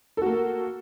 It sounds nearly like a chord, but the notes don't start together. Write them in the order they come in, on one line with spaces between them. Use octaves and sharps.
A4 F#4 A#3